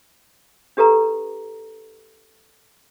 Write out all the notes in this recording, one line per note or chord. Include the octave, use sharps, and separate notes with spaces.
D4 G4 A4 B4 A#5